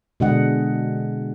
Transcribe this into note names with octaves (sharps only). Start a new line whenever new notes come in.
B2 D3 G#3 D4 D#5 F#5